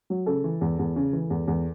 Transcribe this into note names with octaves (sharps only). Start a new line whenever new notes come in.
F#3
C#3 A4
E3
E2
E2
C#3
E3
E2
E2